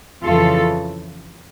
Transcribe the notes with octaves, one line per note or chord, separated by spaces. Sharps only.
F2 C#3 E3 F4 A4